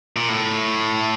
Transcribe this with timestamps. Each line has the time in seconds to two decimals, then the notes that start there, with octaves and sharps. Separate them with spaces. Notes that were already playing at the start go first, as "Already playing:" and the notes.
0.16 A#2
0.29 A2